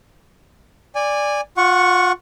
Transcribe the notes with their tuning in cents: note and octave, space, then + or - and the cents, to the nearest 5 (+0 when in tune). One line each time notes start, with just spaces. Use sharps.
D5 +0 G#5 -20
F4 +30 F#5 -5 C#6 +0